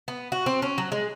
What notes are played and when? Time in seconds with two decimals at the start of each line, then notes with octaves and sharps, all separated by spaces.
0.08 B3
0.32 F#4
0.46 C4
0.62 C#4
0.78 F#3
0.92 G#3